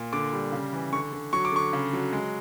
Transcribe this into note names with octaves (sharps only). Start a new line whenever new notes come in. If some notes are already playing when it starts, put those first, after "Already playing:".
Already playing: A#2
D3 D6
G3
C#3
E3
D3 C#6
D3
F#3 C#6
D6
D3 C#6
C#3
F#3
G#3